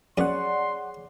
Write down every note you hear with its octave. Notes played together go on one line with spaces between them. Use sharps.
F#2 B3 G#4 C#5 D5 F#5 C6